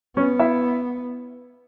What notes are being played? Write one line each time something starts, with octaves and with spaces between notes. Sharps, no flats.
B3 C#4 C#5
E4 E5